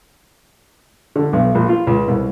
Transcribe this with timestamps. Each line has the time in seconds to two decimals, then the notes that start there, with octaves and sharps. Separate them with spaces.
1.16 D3
1.33 B1
1.55 A#1
1.69 F4
1.87 C#2
2.08 C2